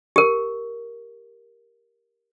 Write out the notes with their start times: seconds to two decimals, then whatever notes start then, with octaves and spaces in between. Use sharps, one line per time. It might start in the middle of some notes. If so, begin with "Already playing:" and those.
0.16 G4 A#4